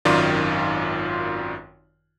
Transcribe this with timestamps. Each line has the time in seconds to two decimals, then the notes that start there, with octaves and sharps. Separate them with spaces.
0.05 G#1 F#2 D#3 F4 D5